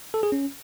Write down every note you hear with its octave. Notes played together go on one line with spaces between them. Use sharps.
A4
G#4
C#4